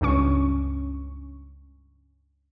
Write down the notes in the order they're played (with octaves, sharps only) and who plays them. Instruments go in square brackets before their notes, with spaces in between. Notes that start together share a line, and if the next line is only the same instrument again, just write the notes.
[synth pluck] C#2 G2 C#4 C#6